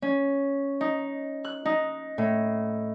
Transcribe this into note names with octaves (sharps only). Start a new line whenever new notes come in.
C#4
D#4
F#6
D#4
A2